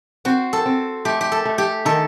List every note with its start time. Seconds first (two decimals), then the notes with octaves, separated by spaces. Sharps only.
0.25 C4 F#4
0.53 A4
0.66 C4
1.05 A3 G4
1.21 G4
1.32 A4
1.45 A3
1.58 G4
1.85 D#3 A4